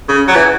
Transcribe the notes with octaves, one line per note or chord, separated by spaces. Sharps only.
C#3
F#3
E3